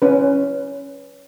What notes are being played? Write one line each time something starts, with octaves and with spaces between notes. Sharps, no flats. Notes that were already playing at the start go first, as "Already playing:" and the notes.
C#4 B4